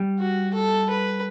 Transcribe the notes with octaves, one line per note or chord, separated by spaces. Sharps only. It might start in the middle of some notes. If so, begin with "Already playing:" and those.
Already playing: G3
F#4
A4
B4